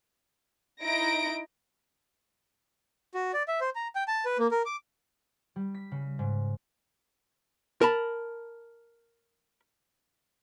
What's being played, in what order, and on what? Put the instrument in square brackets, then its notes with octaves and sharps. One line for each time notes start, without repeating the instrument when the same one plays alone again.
[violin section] D#4 E4 A#6 D7
[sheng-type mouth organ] F#4
D5
E5
C5
A#5
G5
A5
B4
A#3
A#4
D6
[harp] G3
B6
C#3
G#2
[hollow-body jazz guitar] A#4 A5 B5